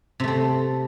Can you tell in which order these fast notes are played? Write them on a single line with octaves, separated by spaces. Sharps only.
C3 A3 C4